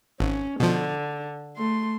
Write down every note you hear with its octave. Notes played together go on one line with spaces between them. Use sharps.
G#1 C#4
B2 D3 F3
A3 C6